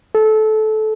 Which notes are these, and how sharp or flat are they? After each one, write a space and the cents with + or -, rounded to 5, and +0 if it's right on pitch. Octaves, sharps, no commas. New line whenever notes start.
A4 -20